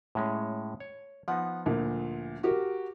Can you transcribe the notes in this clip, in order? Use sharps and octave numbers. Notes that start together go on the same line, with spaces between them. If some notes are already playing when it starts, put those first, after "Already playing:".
A2 G#3 C#4
C#5
F3 B3 D#4 F#5
D2 A#2 D3
F#4 G4 A#4